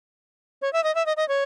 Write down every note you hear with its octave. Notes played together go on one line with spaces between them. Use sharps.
C#5
E5
D#5
E5
D#5
D#5
C#5